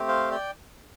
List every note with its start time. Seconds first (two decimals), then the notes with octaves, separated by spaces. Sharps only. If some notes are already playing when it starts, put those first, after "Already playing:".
Already playing: A3 C4 G4
0.08 C5 F5
0.31 D5 G5